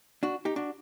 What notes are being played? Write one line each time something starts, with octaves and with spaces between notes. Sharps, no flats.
D4 F#4
D#4 G4
D4 F#4